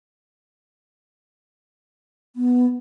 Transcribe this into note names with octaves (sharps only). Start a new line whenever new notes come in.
B3